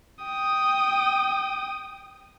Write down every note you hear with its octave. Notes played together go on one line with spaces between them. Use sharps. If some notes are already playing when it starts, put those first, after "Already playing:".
G5 D#6